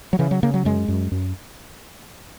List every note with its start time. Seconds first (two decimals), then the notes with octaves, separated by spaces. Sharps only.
0.13 F#3
0.19 C#3 E3
0.31 F#3
0.43 C#3 A#3
0.54 F#3
0.65 F#2 G#3
0.88 F#2
1.12 F#2